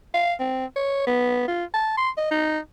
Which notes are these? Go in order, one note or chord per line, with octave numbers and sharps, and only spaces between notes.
F5
C4
C#5
B3
F4
A5
C6
D#5
D#4